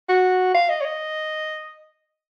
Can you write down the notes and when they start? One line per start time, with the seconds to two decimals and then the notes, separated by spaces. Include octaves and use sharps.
0.09 F#4
0.55 F5
0.69 D#5
0.81 C#5
0.85 D#5